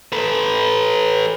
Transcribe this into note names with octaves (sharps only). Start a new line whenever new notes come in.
A4 B4